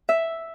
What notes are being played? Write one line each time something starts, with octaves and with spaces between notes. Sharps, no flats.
E5